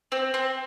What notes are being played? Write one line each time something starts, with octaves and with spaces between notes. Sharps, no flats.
C4
C4